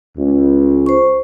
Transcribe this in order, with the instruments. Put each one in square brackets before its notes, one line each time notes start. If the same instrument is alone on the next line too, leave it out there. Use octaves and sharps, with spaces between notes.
[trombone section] C#2
[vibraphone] C5 C#6